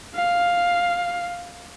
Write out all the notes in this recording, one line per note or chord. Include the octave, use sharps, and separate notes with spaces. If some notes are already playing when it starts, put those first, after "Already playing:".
F5